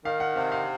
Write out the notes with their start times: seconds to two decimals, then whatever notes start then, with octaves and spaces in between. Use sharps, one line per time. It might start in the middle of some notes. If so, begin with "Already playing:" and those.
0.05 D#3 F5
0.20 F#5
0.36 C3 F5
0.52 F5